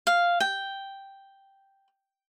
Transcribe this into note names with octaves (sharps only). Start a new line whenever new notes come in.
F5
G5